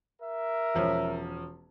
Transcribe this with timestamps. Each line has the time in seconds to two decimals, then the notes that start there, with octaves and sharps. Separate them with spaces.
0.22 A#4 E5
0.75 E1 F3 C#4